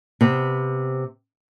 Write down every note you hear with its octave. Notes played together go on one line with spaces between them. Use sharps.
C3 B3 C4